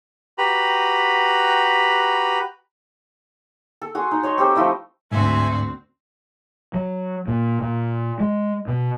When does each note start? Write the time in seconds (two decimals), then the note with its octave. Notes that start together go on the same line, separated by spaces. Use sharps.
0.38 F#4 G4 B4 A#5 B5
3.82 A4
3.95 F#4 G#4 C6
4.11 D#4
4.23 C#5 D#5 C6 C#6
4.38 C4 G4 A4 C5
4.55 F3 A3 E4 D#5
5.12 D2 G#2 C4 F#4 E5 G#5
6.74 F#3
7.28 A#2
7.62 A#2
8.20 G#3
8.68 B2